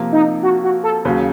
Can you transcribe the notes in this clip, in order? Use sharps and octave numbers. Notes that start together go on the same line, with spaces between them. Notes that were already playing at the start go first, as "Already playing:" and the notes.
Already playing: C3 F3 A#3
D#4
F#4
F#4
A4
D#2 C#3 F#3